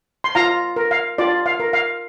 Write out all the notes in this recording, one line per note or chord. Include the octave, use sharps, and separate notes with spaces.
C6
F4 F5 A#5
A#4
F5
F4 D5
F5
A#4
F5